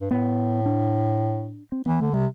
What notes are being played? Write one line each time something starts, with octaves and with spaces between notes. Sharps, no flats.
G2
A2 B3
D4
C4
E3 B3
D3 A3
C3 G3